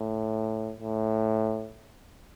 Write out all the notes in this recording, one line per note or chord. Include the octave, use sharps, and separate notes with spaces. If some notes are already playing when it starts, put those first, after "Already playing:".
Already playing: A2
A2